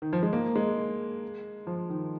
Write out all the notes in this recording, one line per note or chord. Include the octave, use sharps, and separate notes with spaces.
D#3
F3
G#3
A#3
G#3
F3
D#3